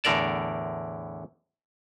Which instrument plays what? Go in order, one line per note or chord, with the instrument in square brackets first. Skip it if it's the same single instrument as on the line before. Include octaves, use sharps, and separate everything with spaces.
[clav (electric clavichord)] E2 A2 D3 A#4 D5 A5